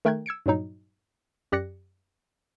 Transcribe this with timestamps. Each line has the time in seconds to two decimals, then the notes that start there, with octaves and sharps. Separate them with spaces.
0.05 D#3 A3 A#4 G5 F#6 G#6
0.26 E6 G#6 C#7 D7
0.46 G2 A#2 F#3 D#4
1.52 F#2 G4 D5 F#6 A#6 C#7